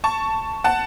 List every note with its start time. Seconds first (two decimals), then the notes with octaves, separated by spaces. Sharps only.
0.04 A5 C#6
0.64 F#5 A5